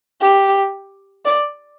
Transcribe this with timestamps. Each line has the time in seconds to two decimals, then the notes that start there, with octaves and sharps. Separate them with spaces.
0.22 G4
1.25 D5